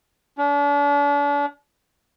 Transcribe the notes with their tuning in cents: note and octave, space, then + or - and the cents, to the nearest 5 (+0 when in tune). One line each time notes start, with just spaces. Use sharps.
D4 -40